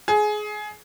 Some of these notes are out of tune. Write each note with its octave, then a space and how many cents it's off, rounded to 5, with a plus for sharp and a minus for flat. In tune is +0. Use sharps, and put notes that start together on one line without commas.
G#4 +20